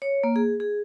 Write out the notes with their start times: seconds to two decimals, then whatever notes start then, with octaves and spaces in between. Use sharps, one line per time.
0.02 C#5
0.24 A#3
0.36 G#4
0.60 G#4